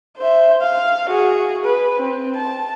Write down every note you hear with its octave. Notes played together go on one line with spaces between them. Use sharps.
C5 E5
F5
F#4 G#4
B4
C4
A5